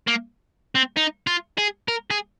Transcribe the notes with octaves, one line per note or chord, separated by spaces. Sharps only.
A#3
C4
D#4
F4
G#4
A#4
G#4